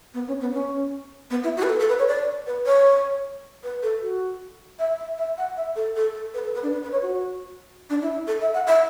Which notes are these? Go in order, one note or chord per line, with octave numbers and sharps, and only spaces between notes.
B3
C#4
B3
C#4
B3
E4
F#4
B4
A4
A4
B4
C#5
D5
B4
C#5
B4
A4
F#4
E5
E5
E5
F#5
E5
A4
A4
A4
B4
A4
B4
D4
B4
B4
C#5
F#4
D4
E4
A4
E5
F#5
E5